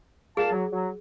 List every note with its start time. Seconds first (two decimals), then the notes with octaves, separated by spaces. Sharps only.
0.37 A#2 G#4 F5 A5
0.52 F#3
0.72 F#3